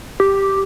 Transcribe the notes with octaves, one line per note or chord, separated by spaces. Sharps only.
G4